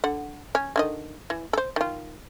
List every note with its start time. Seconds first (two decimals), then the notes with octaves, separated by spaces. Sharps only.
0.04 D3 F#5
0.55 C#4
0.76 D3 D#3 D#5
1.30 E3
1.53 A4 C5
1.76 D#3 F4